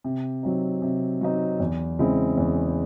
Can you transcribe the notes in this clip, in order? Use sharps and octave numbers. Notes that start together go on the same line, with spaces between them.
C3
F#3 C4 D#4
C3
F#3 C4 D#4
E2
C#3 G#3 C4 E4
E2